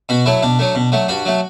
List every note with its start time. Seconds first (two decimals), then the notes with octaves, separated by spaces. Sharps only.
0.09 B2 F#4
0.26 F#3 A3 E4
0.43 B2 D4
0.59 F#3 A3
0.75 B2
0.92 F#3 A3
1.08 G2 F#4
1.25 F#3 A3